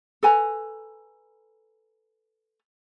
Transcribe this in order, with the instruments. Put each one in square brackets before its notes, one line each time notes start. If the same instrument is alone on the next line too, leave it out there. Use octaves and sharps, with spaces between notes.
[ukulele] A4 B4 G#5 A#5